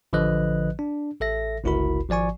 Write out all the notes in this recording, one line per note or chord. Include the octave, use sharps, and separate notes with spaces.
A1 D3 F3 B4 D#5 F#6
D4
A1 A4 E5 A#6
G1 C#2 E4 F#4 A#4 B5
G#1 F3 D5 G#5 C#6